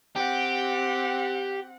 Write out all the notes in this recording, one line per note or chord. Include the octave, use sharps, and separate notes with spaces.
C4 G4 F#5